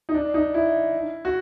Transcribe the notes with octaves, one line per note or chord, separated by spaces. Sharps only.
D#4
D4
D#4
E4
F#4